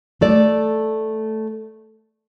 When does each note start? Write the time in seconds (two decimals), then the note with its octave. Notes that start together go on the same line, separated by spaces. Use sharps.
0.21 A3 A4 D5